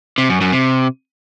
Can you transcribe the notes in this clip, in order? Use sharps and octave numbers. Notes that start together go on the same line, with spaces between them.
C3
F#2
F#2
C3